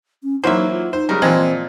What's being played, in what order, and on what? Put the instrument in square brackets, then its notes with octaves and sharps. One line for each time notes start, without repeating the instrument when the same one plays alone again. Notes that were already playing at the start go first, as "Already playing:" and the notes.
[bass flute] C#4
[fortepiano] E3 F#3 A#3 [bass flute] D#4 [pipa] C5 E5
[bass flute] F4
[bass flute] D#4 [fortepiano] C5
[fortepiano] C#3 G3 G#3 [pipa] A#4
[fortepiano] A#2 F3 [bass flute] E3 [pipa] G#3 [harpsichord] C4